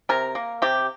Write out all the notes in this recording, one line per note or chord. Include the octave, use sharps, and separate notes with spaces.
C3 A#4
A#3
C3 G4